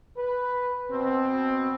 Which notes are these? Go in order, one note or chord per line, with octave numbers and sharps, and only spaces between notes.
B4
B2 C4